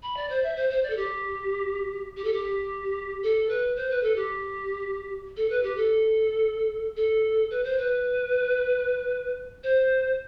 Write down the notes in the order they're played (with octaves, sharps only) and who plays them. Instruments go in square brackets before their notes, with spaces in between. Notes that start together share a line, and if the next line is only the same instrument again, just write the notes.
[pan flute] B5
D5
C5
E5
C5
C5
D5
A4
G4
G4
A4
G4
A4
B4
C5
B4
A4
G4
A4
B4
G4
A4
A4
B4
C5
B4
C5